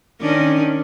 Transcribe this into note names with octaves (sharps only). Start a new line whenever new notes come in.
D#3 C#4 D4